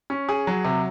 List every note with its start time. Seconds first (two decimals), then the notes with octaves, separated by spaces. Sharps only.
0.10 C#4
0.29 G#4
0.47 F#3
0.65 C3